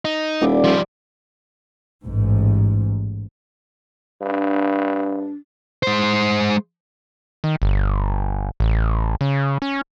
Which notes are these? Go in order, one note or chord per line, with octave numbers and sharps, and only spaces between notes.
D#4
D#1 E4 D5 E5
F3 G3
A1 G#2
G2 D4
G#3 C5
D#3
G1
A1
C#3
C#4